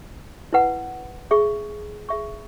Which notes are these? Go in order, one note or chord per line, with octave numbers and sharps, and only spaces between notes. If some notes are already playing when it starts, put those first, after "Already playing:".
E4 B4 F#5
G#4 E5 C#6
G#4 E5 C#6